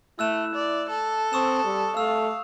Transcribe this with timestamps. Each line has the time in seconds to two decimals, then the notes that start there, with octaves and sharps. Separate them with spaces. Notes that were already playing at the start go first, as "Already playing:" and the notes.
0.19 A3 E4 E6 F#6 E7
0.55 D5
0.90 A4
1.33 C4 C#6 D#6 E7
1.65 G3
1.97 A3 F5 E6